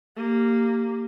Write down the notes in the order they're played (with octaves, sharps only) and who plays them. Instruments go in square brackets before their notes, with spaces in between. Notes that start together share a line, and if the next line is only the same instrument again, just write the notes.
[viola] A#3 G4